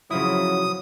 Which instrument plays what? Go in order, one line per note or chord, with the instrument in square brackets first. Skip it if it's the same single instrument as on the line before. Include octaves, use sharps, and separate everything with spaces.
[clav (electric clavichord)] C#3 F3 E4 [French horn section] F#3 [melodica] D#6